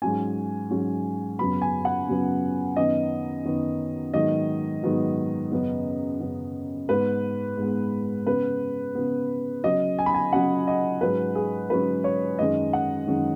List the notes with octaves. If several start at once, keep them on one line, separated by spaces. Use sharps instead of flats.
G#2 F#3 C#4 G#5
G#2 F#3 C#4
F#2 C#3 F#3 B3 B5
G#5
F#5
F#2 C#3 F#3 B3
F#2 D#3 B3 D#5
F#2 D#3 B3
G#2 D#3 F#3 B3 D#5
G#2 D#3 F#3 B3
F#2 C#3 B3
F#2 C#3 B3
G#2 G#3 B3 B4
G#2 G#3 B3
C#3 B3 B4
C#3 B3
C#3 F#3 C#4 D#5
G#5
B5
G#5
C#3 F#3 C#4 F#5
D#5
G#2 F#3 C#4 B4
G#4
G#2 F#3 C#4 B4
C#5
F#2 D#3 G#3 C#4 D#5
F#5
F#2 D#3 G#3 C#4